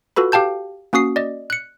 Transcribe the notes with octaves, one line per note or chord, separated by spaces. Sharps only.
F4 F#4 A4 B4 B5
G4 F5 G5 A5 G6
A#3 C#4 F#4 D#6 C7
D5 D#5
F#6 C#7